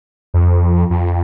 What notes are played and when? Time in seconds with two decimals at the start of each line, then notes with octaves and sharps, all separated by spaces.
0.34 F2
0.90 F2